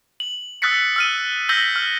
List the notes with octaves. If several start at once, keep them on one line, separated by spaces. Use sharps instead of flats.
F#7
D#6 E6 F#6 A6 B6 C#7
E6 F6 D#7
E6 G6 A#6 B6 F#7 G7
F6